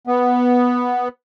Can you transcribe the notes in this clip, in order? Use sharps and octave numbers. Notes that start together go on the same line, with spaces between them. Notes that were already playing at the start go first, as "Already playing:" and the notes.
B3